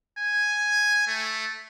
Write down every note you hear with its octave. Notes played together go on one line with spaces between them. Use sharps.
G#5
A3